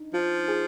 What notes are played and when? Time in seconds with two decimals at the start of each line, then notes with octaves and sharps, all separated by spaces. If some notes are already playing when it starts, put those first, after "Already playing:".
Already playing: D4 D#4
0.14 F3 F4
0.48 G#4